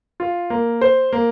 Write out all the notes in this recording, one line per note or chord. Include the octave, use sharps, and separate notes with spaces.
F4
A#3
C5
A#3